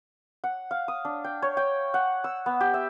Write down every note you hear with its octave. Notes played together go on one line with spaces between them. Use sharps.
F#5
F5
D#6
D4
G5
C#5
G5
F#5
E6
B3
G4
E5